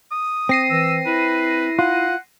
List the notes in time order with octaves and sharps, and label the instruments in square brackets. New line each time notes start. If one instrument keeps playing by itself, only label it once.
[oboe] D#6
[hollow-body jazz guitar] C4 [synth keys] A#6 C7 D#7
[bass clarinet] E3 [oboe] E6
[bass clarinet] E4 [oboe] B4
[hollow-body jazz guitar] F4 [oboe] F#5